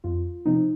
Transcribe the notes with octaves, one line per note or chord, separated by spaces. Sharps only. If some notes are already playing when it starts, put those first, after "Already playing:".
F2 F4
C3 F3 C4 D#4